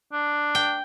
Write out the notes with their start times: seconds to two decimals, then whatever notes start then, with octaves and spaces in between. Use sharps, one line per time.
0.13 D4
0.55 G5